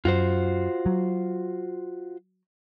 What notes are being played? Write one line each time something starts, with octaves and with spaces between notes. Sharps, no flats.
F#2 F4 F#4 C5
F#3